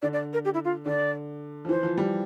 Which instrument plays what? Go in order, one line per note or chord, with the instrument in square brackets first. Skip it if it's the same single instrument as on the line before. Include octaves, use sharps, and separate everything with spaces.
[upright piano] D3 [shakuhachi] D5
[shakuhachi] D5
A#4
G4
E4
F4
[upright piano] D3 [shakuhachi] D5
[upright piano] F3
[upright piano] E3 [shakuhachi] C5
[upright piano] F3
G3